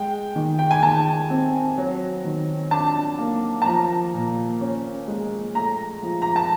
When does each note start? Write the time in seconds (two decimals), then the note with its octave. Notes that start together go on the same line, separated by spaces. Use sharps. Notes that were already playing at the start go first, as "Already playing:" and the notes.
Already playing: G#3 G5
0.36 D#3
0.59 G5
0.71 G#5
0.83 D#3 A5
1.30 C4
1.78 F#3
2.25 D#3
2.71 D4 A5
3.18 A#3
3.62 A5
3.66 F3 A#5
4.14 A#2
4.61 C#4
5.08 G#3
5.55 A3 A#5
6.03 F3
6.22 A#5
6.36 A5